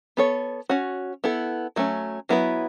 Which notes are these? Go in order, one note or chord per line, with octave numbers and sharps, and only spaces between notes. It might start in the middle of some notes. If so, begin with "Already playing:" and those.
B3 A4 C#5
C#4 F#4 C#5
B3 E4 A4
F#3 A3 C#4
F#3 B3 E4 B4